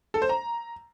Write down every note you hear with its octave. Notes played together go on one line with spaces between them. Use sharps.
A4
C5
A#5